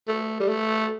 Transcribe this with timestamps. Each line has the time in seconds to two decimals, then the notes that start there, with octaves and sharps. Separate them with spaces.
0.08 A3
0.40 G3
0.49 A3